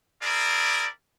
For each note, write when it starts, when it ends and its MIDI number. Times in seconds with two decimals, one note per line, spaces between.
0.22 0.86 60
0.22 0.86 64
0.22 0.86 68
0.22 0.86 70
0.22 0.86 74